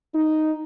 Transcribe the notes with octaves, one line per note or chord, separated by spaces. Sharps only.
D#4